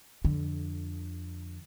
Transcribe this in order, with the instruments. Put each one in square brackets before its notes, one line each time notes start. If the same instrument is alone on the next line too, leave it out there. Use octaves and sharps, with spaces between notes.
[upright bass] F2 D3